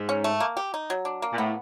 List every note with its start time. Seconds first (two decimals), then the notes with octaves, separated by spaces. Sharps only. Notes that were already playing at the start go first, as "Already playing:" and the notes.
Already playing: G#2
0.09 C#4
0.24 A3
0.40 A#3
0.57 G4
0.74 D#4
0.90 F#3
1.05 D4
1.22 A#3
1.33 A#2
1.37 A2 B3